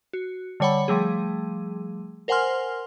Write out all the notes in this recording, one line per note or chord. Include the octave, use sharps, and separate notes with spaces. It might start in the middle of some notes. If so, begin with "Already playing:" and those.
F#4
D3 G3 C#5 F#5 B5
F3 G3 A3 G#4
A#4 C5 F#5 G#5 C6 F6